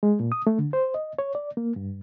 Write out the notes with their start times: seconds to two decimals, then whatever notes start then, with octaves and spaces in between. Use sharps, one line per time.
0.03 G#3
0.20 A#2
0.32 D#6
0.47 A3
0.59 D3
0.73 C5
0.94 D#5
1.19 C#5
1.35 D5
1.57 A#3
1.76 G2